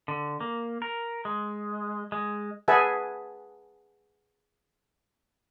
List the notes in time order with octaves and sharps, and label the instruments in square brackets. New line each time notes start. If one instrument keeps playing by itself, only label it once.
[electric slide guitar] D3
A#3
A#4
G#3
G#3
[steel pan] G#4 B4 E5 F#5 G#5 A5